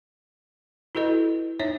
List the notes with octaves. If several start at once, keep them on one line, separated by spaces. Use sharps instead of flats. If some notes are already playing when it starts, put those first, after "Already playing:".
E4 F#4 A4 B4 D#5
D#4 C#5 E5